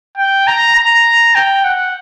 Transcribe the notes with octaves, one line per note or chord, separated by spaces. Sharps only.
G5
A#5
A#5
G5
F#5